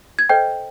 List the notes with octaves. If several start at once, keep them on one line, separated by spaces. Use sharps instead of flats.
G#6
A4 C5 D#5 G5 G6